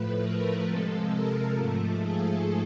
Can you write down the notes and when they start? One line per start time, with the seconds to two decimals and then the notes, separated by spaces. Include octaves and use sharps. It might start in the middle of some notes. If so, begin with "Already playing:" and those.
Already playing: A2 F3 A3 B4
0.20 A#4
0.66 C3 F3 G#3 A4
1.12 A#4
1.57 G#2 F3 A3 A4
2.02 G#4